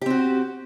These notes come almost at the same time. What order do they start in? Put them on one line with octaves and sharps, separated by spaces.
G4 C4 F#4